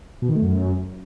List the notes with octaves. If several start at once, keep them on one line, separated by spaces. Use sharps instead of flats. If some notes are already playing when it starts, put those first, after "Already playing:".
B2
D#3
A3
F#2